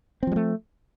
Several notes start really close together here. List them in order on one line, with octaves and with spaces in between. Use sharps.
C4 F3 G3 A3